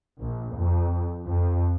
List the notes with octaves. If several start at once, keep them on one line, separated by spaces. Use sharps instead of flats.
A#1
F2
F2